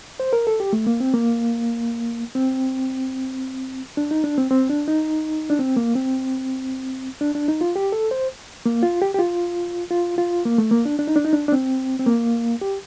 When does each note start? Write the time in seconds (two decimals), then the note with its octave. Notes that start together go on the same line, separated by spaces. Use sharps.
0.20 C5
0.33 A#4
0.47 A4
0.60 G4
0.73 A3
0.87 A#3
1.00 C4
1.14 A#3
2.35 C4
3.97 D4
4.11 D#4
4.24 D4
4.38 C4
4.51 C4
4.69 D4
4.88 D#4
5.50 D4
5.59 C4
5.76 A#3
5.95 C4
7.21 D4
7.35 D4
7.48 D#4
7.61 F4
7.76 G4
7.92 A4
8.11 C5
8.66 A#3
8.83 F4
9.01 G4
9.14 G4
9.19 F4
9.91 F4
10.18 F4
10.46 A#3
10.58 A3
10.71 A#3
10.85 D4
10.99 D4
11.08 D#4
11.16 D4
11.25 D#4
11.33 D4
11.48 D4
11.52 C4
11.99 C4
12.06 A#3
12.61 G4